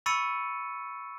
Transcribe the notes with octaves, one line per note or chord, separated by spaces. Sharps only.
B5 C#6 E6 A6 C#7 D#7